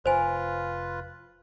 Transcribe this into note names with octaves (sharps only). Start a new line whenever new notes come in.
F1 F4 B4 C5 G#5